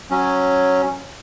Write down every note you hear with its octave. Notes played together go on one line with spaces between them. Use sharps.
F#3 C#4